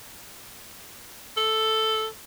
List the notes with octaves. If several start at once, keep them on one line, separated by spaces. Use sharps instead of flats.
A4